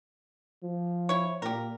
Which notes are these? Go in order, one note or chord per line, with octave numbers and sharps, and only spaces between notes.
F3
E4 C#5
A#2 G4 A#4